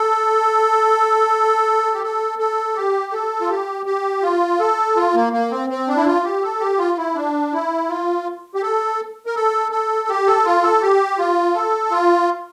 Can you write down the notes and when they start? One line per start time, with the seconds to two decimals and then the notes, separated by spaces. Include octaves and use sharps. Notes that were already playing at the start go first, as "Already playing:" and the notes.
Already playing: A4
1.94 G4
2.03 A4
2.39 A4
2.76 G4
3.13 A4
3.41 F4
3.49 G4
3.86 G4
4.22 F4
4.60 A4
4.96 F4
5.15 A#3
5.33 A#3
5.51 C4
5.70 C4
5.88 D4
5.97 E4
6.06 F4
6.24 G4
6.43 A4
6.60 G4
6.78 F4
6.98 E4
7.15 D4
7.53 E4
7.89 F4
8.55 G4
8.62 A4
9.26 A#4
9.36 A4
9.72 A4
10.09 G4
10.27 A4
10.45 F4
10.63 A4
10.82 G4
11.19 F4
11.55 A4
11.91 F4